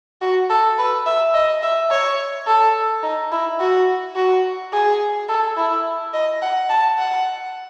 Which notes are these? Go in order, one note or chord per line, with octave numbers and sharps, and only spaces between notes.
F#4
A4
B4
E5
D#5
E5
C#5
A4
D#4
E4
F#4
F#4
G#4
A4
E4
D#5
F#5
A5
F#5